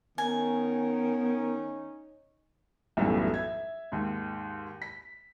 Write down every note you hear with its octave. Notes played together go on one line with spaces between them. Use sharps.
D#3 B3 C#4 D#4 G#5
B1 F#2 A2 E3 G3
E5 G#6
D#2 G#2
B6